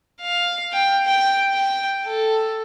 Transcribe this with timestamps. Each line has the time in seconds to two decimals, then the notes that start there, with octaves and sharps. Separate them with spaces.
0.21 F5
0.73 G5
1.06 G5
1.54 G5
2.06 A4